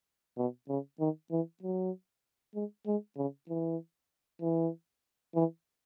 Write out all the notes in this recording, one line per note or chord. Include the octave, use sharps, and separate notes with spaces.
B2
C#3
D#3
E3
F#3
G#3
G#3
C#3
E3
E3
E3